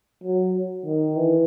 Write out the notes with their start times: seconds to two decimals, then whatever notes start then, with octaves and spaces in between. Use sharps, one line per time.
0.24 F#3
0.86 D#3
1.16 E3